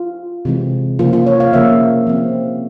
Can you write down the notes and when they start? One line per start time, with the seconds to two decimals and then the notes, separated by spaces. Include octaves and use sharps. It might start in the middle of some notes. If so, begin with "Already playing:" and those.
Already playing: F4
0.45 C3 E3 G#3 C4
0.99 C#3 F3 A#3 F4
1.13 F4
1.27 C#5
1.40 F5
1.53 C#3 F3 A#3 E5
2.07 F3 C4